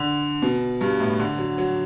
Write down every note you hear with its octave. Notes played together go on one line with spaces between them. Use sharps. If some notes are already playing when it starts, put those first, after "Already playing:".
Already playing: D3
B2
G2
A2
D3
F#3
F#3